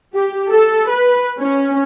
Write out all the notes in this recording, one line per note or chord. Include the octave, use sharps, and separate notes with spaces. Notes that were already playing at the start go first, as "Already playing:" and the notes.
G4
A4
B4
C#4